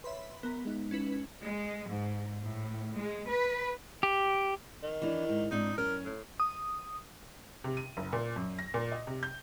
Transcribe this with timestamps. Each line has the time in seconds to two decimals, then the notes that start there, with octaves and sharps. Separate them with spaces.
0.04 B4 C#5 E5 B5 C6
0.43 B3 A#4 A#5
0.65 G#3 D#4
0.91 C#4 E4 B4
1.42 G#3
1.88 G#2
2.41 A2
2.96 G#3
3.30 B4
4.03 G4
4.83 D#3
5.02 E3 D4
5.29 G#2
5.51 G#2 C4 D4 D#4
5.78 F#2 C#4 A#4
6.05 A2
6.40 D#6
7.64 C3
7.77 D#7
7.97 F#1
8.13 A#2
8.36 F#2
8.59 A#6
8.74 A#2
8.92 D#5
9.07 C3
9.23 G6